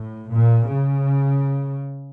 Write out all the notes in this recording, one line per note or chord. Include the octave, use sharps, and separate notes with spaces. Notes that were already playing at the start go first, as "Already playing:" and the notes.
Already playing: A2
A#2
C#3